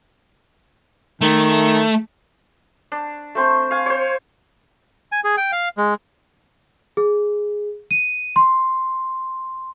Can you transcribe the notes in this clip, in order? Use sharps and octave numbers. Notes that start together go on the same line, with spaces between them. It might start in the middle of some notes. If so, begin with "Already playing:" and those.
D#3 A3
D4
A3 C4 C5
F5 G#5
C5 C#5
G#5
G#4
G5
F5
G#3
G#4
D#7
C6